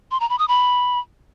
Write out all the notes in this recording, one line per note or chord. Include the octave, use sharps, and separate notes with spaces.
C6
A#5
B5
D#6
B5